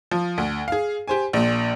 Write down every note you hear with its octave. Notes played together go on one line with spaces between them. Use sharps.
F3
D2
G#4 F5
G4 C5 G#5
A#1 A#2